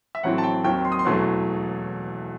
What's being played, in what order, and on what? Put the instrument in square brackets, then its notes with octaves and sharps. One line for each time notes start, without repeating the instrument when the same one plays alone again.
[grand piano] E5
A1 A2 F#3 C4 F#5
A5
G5
D#2 D#3 F#3 C4 G5
C6
D#6
C6
E1 E2 B2 F#3 A3